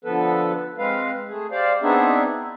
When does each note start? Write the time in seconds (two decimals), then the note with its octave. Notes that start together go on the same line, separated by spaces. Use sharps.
0.05 D3 F3 B3 A4 B4
0.78 G#3 C4 B4 F5
1.29 A3 G#4
1.51 G4 C5 D5 F5
1.82 B3 C4 D4 D#4 G#4 E5
2.37 E4